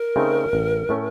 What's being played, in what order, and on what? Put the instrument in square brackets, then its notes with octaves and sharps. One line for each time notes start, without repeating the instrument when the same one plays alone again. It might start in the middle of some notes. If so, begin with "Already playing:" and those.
Already playing: [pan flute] A#4
[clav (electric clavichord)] C#3 A3 C4 D#4
A1
A2 A3 C#4